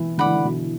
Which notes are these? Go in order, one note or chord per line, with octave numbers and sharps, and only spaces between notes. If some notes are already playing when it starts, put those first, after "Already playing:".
Already playing: B2 E3
D3 D5 F#5 B5
E3
D3
B2